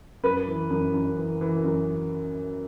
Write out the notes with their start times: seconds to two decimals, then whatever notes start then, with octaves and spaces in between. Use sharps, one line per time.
0.23 F#2 B4
0.47 E3
0.70 F#2
0.94 F#2
1.18 E3
1.41 E3
1.64 F#2